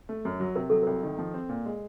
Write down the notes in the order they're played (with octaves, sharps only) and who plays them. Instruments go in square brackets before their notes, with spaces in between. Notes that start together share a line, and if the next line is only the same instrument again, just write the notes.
[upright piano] A3
F#2
F#3
[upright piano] C3 [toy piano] A#4
[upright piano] F#3 [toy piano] A4
[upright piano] C2 [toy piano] A#4
[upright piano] D#3
F3
C4
A#2
G#3